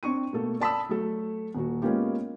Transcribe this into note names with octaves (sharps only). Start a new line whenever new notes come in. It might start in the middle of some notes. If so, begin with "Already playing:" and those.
C4 D4 C#6 D#7
B2 A3 A#3 A4
D5 A5 B5 D#6 E6
F#3 A3 A4
D#1 F#4
G#3 A#3 B3 C#4 F4 G4